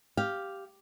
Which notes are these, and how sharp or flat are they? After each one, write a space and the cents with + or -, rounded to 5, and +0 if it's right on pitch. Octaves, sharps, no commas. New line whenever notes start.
G4 +0 F5 +0